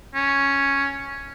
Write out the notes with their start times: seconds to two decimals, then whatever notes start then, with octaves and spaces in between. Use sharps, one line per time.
0.15 C#4